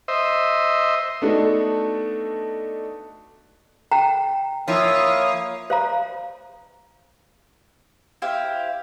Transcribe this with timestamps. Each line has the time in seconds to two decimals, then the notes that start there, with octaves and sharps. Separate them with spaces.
0.08 C5 D#5 E5
1.22 A3 B3 D4 D#4 F#4 A4
3.92 G5 A#5
4.68 F3 A#3 E4 C#5 F5 D#6
5.70 C5 F5 A#5
8.22 E4 G4 C5 F5